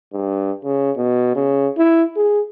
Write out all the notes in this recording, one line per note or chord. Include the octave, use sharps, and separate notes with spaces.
G2
C#3
B2
C#3
E4
G#4